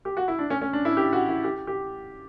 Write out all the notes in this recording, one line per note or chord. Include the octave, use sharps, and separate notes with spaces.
G4
F#4
E4
D4
C#4
C#4
D4
E4
G4
F#4
E4
G4
G4